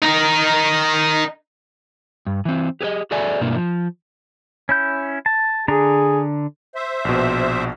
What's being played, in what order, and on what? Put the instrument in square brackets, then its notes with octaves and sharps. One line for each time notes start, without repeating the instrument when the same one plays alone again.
[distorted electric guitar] D#4 A#4
[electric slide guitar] G2
E3 C4
G4 G#4 B4 D#5
F#4 G#4 A4 D5 E5 G#5
G2 B2 A#3 D4 E4
F3
[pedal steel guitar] C#4 E4 G6
A5
[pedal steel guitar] D3 D4 A#5 [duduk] G#4
[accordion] C5 E5
[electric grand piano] A#1 B2